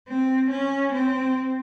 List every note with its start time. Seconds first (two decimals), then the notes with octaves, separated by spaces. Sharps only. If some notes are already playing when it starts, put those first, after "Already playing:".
0.08 C4
0.51 C#4
0.93 C4